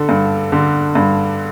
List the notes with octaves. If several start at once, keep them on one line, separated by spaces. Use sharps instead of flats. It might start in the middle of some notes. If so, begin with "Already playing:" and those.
Already playing: D3 A4
G2
D3
G2